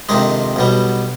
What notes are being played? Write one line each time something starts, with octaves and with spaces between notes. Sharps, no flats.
F2 C3 D#3 G#3 D4
B1 B2 G3